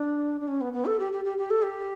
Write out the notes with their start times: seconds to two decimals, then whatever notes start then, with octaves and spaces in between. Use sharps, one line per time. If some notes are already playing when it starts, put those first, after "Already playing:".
Already playing: D4
0.41 D4
0.48 C#4
0.61 B3
0.73 B3
0.86 A4
0.99 G4
1.12 G4
1.25 G4
1.38 G4
1.50 A4
1.62 G4